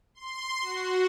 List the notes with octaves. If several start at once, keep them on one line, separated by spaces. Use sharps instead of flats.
C6
F#4